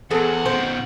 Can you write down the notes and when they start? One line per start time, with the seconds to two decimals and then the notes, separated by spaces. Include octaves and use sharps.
0.11 E2 C4 G#4 A4 F#5
0.46 B2 D#3 C5